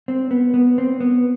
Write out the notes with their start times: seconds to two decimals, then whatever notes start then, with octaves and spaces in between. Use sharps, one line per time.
0.08 C4
0.31 B3
0.54 B3
0.78 C4
1.00 B3